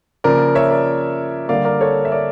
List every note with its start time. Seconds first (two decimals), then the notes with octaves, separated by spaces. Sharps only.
0.24 C#3 F3 A#3 A#4 D5
0.55 C#5 E5
0.71 A#4 D5
1.49 D3 G3 A#3 D5 F5
1.65 A#4 D5
1.81 A4 C#5
2.05 E5
2.12 A#4 D5